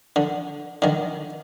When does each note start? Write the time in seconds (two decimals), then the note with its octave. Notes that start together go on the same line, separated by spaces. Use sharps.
0.16 D3
0.82 D3 D#3